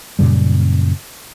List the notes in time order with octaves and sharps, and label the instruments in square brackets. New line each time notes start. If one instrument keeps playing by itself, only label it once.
[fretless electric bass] F#2 A#2 C#3 G3